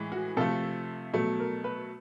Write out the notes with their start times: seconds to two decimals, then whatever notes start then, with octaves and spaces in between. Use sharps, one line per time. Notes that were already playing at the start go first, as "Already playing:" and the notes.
Already playing: A2 E3 G#3
0.12 F#4
0.37 C3 F3 A3 A4
1.14 B2 F#3 A3
1.40 A#4
1.64 B4